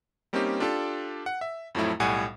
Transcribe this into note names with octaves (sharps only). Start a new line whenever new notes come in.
G3 A#3 C4 C#4 D#4 G4
D4 F4 G4 A4 C6
F#5
E5
F2 A2 F3 F#3 A3 E4
B1 A2 G3 F#5 G#5